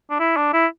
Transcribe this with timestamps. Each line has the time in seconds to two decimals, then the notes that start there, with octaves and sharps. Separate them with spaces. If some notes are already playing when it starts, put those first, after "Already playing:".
0.10 D4
0.19 E4
0.36 D4
0.53 E4